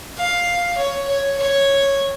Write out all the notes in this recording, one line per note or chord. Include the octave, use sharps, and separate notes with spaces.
F5
C#5
C#5
C#5